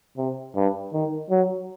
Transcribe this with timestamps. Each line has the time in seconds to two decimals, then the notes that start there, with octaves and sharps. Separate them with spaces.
0.17 C3
0.55 G2
0.93 D#3
1.30 F#3